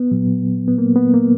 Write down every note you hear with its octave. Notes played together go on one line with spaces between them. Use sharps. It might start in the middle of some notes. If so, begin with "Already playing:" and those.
Already playing: B3
A#2 F#3
B3
A#3
B3
A#3